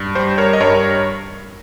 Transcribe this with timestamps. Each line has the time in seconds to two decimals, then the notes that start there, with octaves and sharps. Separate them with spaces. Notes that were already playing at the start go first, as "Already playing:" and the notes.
Already playing: G2
0.15 G3 C5
0.38 A#4 C#5
0.53 D#5
0.60 G2 A#4 C#5